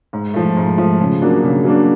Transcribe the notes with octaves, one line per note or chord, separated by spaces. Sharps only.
G#2
F3 A3
G#2
F3 A3
C#3
F#3 A#3 D4
C#3
F#3 A#3 D4